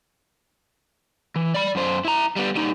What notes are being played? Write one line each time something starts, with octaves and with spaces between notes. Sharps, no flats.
E3
D5 B5
F#2 C5
E4 A#5
G3 B3
G3 D#4